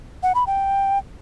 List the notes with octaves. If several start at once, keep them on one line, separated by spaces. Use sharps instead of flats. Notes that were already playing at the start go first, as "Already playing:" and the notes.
F#5
B5
G5